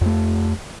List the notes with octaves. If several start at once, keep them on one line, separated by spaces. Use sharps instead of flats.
F2 A3